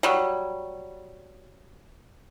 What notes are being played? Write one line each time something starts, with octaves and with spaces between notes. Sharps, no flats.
F#3 G3